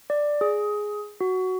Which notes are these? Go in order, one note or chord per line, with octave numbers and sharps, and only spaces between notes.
D5
G#4
F#4